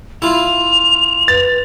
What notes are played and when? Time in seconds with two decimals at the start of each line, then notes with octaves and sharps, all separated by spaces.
0.22 E4 F4 F7
1.28 B4 A6